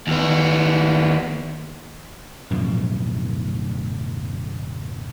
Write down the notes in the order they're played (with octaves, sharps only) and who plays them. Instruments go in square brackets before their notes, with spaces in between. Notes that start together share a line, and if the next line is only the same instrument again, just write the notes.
[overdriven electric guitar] D#2 B3
[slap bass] D1 F#2 B2 F3